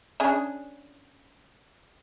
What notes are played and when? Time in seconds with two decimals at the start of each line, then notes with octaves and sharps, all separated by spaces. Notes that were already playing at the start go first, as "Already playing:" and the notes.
0.20 C#4 D4 G#4